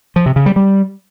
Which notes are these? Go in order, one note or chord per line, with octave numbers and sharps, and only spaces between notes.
F3
C3
C#3
G3
G3